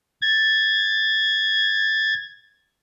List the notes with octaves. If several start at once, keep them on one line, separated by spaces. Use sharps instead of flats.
G#6 A6